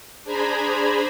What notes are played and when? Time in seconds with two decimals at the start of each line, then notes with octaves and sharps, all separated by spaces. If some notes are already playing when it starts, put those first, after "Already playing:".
0.24 D4 G#4 C5 G#5 A#5 B5